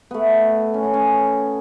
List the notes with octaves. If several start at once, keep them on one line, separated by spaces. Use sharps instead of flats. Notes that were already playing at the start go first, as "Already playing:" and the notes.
A3 B3
C#4
B3
C#4